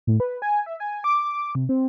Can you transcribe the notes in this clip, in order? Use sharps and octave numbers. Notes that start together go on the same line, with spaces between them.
A2
B4
G#5
E5
G#5
D6
C3
C4